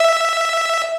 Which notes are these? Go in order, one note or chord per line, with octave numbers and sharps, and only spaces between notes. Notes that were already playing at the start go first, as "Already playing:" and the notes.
Already playing: E5